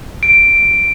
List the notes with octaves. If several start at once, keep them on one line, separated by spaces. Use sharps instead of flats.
D7